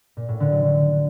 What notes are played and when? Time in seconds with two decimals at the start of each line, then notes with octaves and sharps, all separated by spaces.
0.17 A#2
0.28 A2
0.40 D3
0.52 F#3
0.64 D3